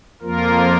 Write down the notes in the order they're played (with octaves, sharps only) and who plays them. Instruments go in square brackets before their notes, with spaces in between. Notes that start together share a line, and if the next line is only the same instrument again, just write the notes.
[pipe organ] F2 F3 A#3 F4 A#4